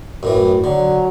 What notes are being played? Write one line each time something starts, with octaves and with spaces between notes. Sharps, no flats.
F#2 A2 E3
D3 F#3